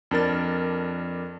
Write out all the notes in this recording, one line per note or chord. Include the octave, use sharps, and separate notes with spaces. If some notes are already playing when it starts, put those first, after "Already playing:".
F2 D4 A#4 A6